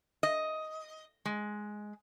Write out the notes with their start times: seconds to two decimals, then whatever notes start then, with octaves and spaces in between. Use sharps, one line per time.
0.23 D#5
1.25 G#3